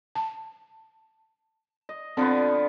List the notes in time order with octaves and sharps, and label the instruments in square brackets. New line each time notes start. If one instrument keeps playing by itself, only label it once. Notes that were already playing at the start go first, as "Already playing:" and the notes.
[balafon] A5
[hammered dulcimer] D#5
[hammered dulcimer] D3 F3 B3 [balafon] C4